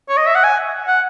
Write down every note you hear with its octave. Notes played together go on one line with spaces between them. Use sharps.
C#5
D#5
E5
F#5
G#5
F#5